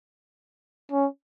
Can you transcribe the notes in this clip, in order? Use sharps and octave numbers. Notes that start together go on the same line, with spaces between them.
C#4